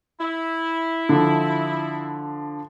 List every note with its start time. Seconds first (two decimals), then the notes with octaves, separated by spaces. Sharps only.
0.19 E4
1.09 D3 F3